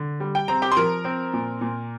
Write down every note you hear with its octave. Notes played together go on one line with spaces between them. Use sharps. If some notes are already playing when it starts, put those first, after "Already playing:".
Already playing: D3
G3
G5
C4 A#5
G4 G5
C6
F3 A#4 A#5
C4
A#2
A#2